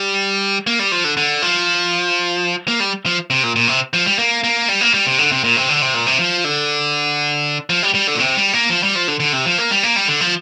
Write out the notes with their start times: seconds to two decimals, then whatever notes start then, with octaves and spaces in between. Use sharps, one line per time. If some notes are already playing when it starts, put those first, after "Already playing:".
Already playing: G3
0.67 A#3
0.79 G3
0.92 F3
1.04 D3
1.17 D3
1.42 F3
2.68 A#3
2.80 G3
3.06 F3
3.30 C3
3.43 A#2
3.56 A#2
3.68 C3
3.93 F3
4.06 G3
4.18 A#3
4.44 A#3
4.68 G3
4.81 A#3
4.94 G3
5.06 C3
5.19 D3
5.32 C3
5.44 A#2
5.57 C3
5.69 D3
5.82 C3
5.94 A#2
6.06 C3
6.19 F3
6.44 D3
7.70 F3
7.83 G3
7.94 G3
8.07 D3
8.15 A#2
8.20 C3
8.37 G3
8.53 A#3
8.70 F3
8.83 G3
8.95 F3
9.08 D3
9.20 D3
9.33 C3
9.46 F3
9.58 A#3
9.71 G3
9.83 A#3
9.96 G3
10.08 D3
10.21 F3